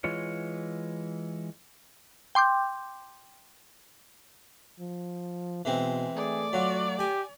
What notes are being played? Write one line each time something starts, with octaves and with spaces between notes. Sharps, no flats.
E3 G#3 F4 C#5
G5 C6 D6 G6
F3
B2 E3 G#3 C4
A3 G#4 D5
F#3 F4 F#4
G4 G#5